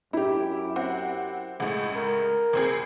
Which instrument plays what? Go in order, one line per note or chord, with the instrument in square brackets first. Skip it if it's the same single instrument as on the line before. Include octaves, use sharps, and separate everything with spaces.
[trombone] F#2 [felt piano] E4 G4
[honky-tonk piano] C4 F#5
[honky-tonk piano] C#2 A2 [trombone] G#3 [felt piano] F#5
[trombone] A#4
[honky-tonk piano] C#2 C4 G#4